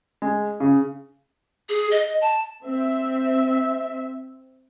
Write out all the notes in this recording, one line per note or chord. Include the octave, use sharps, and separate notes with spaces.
G#3
C#3
G#4
D#5
A5
C4 E5